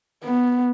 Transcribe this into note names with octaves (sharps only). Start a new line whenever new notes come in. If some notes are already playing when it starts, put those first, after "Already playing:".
B3